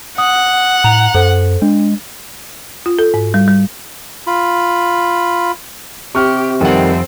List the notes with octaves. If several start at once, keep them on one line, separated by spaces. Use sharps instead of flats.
F#5 D#6
A2 A#5 F7 F#7
F#2 A4 C5
G#3 D4
F4
A4
G#2
G3
G3
F4 B5
C3 G4 C#6 F6
F2 D#3 G3 C4 A4 F#5